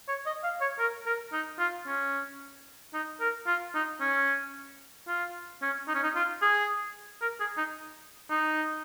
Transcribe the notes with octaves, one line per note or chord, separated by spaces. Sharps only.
C#5
D#5
F5
C#5
A#4
A#4
D#4
F4
C#4
D#4
A#4
F4
D#4
C#4
F4
C#4
D#4
C#4
D#4
F4
G#4
A#4
G#4
D#4
D#4